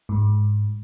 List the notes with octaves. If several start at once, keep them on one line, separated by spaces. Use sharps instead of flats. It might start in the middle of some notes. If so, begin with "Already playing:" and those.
G#2